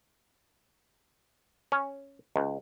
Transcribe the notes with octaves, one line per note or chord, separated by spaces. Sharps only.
C#4
C#2